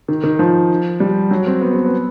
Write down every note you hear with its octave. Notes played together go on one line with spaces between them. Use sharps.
D#3
D#3
F3
G3
F#3
C4
B3
C4
B3